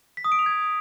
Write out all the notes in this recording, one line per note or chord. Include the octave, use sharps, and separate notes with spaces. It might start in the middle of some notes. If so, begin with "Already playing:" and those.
B6
D#6
D7
F7
G#6